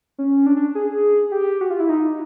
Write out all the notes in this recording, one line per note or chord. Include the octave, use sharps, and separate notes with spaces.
C#4
D4
D4
G#4
G4
F#4
F4
E4
D#4